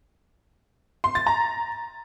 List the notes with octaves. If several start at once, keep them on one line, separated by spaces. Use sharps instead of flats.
C6
A6
A#5